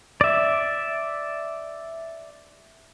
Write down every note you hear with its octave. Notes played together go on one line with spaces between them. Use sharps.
D5 E5